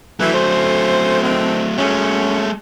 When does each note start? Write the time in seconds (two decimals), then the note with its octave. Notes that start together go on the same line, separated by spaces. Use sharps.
0.20 E3 F#3 A3
0.34 C#4 A4 C5
1.22 D3 D#3 C4
1.78 F#2 G#3 A3 C#4